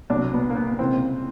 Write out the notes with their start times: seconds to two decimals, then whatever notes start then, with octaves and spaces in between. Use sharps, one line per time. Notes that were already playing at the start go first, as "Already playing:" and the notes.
0.10 C2 B2 F#3 D4
0.33 B3
0.50 A#3
0.55 B3
0.79 C#2 C3 E3 C4